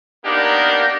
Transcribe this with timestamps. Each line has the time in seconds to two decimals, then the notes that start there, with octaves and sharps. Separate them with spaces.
0.25 A#3 B3 D4 D#4 G4 A#4